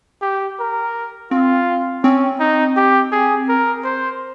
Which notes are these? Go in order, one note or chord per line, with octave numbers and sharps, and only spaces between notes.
G4
A#4
C4 F4
C4 C#4
D#4
G4
G#4
A#4
C5